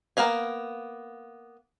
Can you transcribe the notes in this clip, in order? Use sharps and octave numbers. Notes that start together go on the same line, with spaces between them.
A#3 B3 F5 G#5